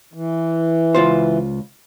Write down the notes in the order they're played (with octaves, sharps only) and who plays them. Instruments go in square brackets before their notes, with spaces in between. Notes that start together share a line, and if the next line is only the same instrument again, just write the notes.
[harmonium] E3
[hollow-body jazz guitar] C#2 F4 C5